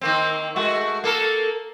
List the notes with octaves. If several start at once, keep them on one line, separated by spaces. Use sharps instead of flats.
D#3 A#3 C4
G#3 A3 F#4
A#3 A4 A#4